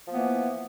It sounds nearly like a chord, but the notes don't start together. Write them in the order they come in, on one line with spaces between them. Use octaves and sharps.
F3 A#3 B3 E3